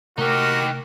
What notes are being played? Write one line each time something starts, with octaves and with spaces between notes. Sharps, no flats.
C3 A3 D#4 F#4 G4 A#4